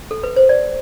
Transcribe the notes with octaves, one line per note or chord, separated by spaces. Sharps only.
A4
B4
C5
D5